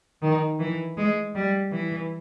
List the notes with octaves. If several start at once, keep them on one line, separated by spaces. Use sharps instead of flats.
D#3
E3
G#3
G3
E3